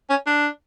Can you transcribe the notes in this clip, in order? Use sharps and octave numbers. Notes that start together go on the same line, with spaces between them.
C#4
D4